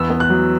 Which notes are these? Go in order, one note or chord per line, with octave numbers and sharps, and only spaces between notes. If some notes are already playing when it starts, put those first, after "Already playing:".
Already playing: E2 B3 E6
B3
F#6
F#3